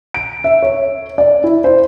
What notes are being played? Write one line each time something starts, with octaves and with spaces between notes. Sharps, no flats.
D7
E5
C#5
D5
E4
C5